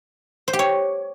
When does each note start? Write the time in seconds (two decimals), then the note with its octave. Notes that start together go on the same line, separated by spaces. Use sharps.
0.48 C5
0.53 G4
0.59 C#5